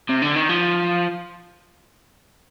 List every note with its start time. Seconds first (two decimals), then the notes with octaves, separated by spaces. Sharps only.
0.09 C3
0.22 D3
0.36 D#3
0.50 F3